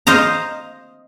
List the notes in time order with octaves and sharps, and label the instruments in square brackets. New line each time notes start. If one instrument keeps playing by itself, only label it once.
[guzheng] C5 D#5 F5 A#5